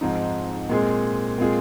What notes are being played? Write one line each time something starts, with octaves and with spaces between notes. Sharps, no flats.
G#2 F3 C4 D#4
A#2 G#3 C4 G#4
A#2 G#3 C4 F4 G#4